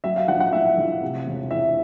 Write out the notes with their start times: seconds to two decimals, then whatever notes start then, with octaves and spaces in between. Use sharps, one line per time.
0.04 F#3 E5
0.16 F5
0.28 A#1 F#5
0.40 F#5
0.53 A2 E5
0.77 A#1
1.01 C3
1.26 E1
1.51 E2 E5